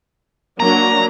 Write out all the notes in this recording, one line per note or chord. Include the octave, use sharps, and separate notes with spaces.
F#3 A#3 D4 A#5